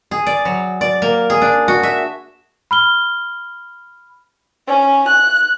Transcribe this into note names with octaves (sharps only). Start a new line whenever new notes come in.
G#4
D5
F#3
D5
A#3
G#4
D4
F#4
E5
B5 F6 G7
C#4
F#6